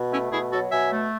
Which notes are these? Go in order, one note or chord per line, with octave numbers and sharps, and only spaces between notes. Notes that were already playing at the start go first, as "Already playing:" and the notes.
Already playing: B2
A3 C#4 E4
B2 E4 G#4
F#3 F#4 A4
B2 E5 G#5
A3